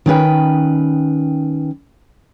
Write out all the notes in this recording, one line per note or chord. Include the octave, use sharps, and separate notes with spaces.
D#3 C#4 B4 G5